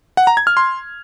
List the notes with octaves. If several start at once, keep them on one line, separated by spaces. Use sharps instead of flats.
F#5
A#5
G#6
F6
C6